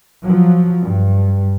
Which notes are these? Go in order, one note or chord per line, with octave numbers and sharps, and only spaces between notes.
F3 F#3
G2